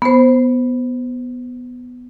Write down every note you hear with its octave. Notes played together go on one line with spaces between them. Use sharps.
B3 C5